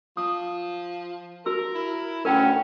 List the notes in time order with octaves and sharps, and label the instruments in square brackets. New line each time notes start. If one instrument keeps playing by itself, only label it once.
[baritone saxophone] F3 [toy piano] D#6
[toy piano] F#4 E6 [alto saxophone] A#4
[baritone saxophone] E4
[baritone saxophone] D2 [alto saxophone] C#4 [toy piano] A#4 F#5 G5